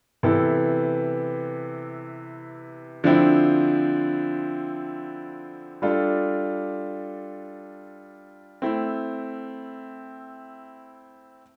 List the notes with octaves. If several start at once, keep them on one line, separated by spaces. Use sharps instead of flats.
C3 E3 B3 E4 A4
D3 F3 C4 E4
G3 D4 F4 A4
A3 C4 E4